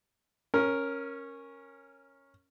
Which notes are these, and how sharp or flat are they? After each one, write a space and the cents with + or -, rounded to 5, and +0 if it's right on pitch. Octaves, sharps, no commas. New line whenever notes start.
C#4 -10 A#4 +0